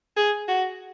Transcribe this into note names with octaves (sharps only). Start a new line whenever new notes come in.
G#4
F#4